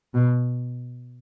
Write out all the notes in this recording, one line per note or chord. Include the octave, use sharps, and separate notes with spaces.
B2